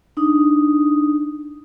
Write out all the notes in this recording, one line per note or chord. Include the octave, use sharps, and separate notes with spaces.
D4 D#4 D#6